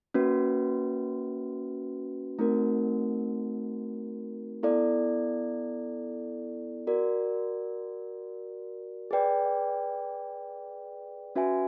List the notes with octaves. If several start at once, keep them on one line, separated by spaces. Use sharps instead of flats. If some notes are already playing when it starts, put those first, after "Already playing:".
A#3 C#4 F#4 B4
A3 C4 D#4 F#4 A#4
B3 E4 A4 D5
F#4 A#4 D5
G#4 B4 D5 G5
C#4 F#4 B4 E5 G#5